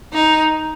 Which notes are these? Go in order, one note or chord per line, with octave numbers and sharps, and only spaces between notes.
D#4